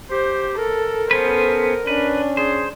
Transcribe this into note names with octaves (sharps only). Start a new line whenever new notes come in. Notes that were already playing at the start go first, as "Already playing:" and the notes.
G4 C5
A4 A#4
B3 C#4 A4 B4 C5
C#4 D4 B4
G#4 C5